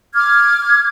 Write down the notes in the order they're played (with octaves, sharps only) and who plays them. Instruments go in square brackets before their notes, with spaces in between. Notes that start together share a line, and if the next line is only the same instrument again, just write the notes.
[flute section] D6 F6 G#6